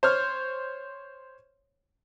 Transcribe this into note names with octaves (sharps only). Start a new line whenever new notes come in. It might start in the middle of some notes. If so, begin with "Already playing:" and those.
C5 C#5 F6